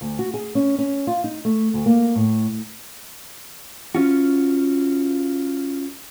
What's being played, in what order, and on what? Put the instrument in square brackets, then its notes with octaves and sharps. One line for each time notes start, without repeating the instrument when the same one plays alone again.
[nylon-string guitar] D2
F#4
G#4
C#4
C#4
F4
D#4
A3
D2
A#3
A2
[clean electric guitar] C#4 F4 F#4